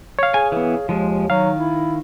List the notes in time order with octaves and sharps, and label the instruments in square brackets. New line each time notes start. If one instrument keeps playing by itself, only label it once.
[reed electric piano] C#5 F5
[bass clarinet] G#4 [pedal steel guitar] G#5
[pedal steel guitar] E3 B3
[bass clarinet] D#2 [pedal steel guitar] F3 G#3
[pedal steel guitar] D#3 [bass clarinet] F#3 [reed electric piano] F5
[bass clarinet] E4